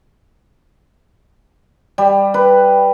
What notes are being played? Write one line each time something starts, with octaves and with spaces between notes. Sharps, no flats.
G3
B4